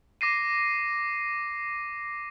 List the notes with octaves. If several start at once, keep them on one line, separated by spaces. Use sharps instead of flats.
D6 A#6 C7 D#7